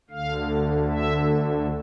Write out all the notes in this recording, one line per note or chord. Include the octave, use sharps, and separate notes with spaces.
D2 D3 F5
E5